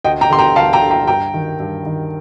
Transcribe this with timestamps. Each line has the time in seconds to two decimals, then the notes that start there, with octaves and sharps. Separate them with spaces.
0.04 D2 D#5 G5
0.21 G5 A#5
0.30 D3 C6
0.39 G5 A#5
0.56 D2 F5 A5
0.73 G5 A#5
0.82 D3
0.91 G5 A#5
1.07 G2 G5 A#5
1.34 D#3
1.60 G2
1.86 D#3